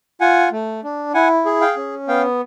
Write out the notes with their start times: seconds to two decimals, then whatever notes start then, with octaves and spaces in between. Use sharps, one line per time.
0.21 F4 F#5 G#5
0.52 A3
0.84 D4
1.14 E4 F#5 G#5
1.45 G#4
1.61 F5 G5
1.76 C#4
2.08 B3 F5 G5